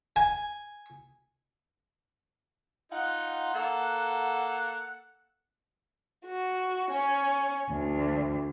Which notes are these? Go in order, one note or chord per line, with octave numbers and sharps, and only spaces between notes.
G#5
D#4 F4 F#5
A#3 A4
F#4
C#4
D2